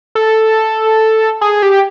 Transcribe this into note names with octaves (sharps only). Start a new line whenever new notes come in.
A4
G#4
G4